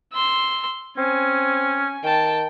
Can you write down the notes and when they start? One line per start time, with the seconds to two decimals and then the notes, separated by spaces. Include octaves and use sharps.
0.13 C6 E6
0.98 C4 C#4 G#5
2.03 D#3 G5 A5